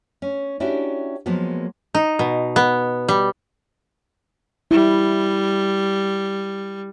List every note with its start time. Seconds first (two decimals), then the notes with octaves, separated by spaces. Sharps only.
0.22 C#4
0.60 C#4 D4 E4 F#4 G4 G5
1.26 F3 F#3 G#3 A#3 B3
1.95 D#4
2.19 B2
2.56 B3
3.08 G3
4.71 G3 E4